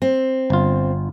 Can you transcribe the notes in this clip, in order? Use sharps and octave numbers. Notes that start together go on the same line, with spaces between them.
C4
G1 F4